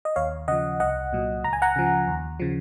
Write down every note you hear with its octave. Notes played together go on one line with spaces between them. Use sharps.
D#5
D#2 C#5 F5
C#3 F3 D#5 F#5
C2 D#5 F#5
A#2 F#3
C#2 A#5
G#5
F#5 A#5
C#3 F3
D#2
C#3 F3